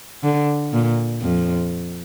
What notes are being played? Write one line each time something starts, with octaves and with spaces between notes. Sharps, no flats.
D3
A#2
F2